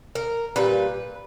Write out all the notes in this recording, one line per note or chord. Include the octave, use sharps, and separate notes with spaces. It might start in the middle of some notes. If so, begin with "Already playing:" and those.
A#4
A#2 G3 B4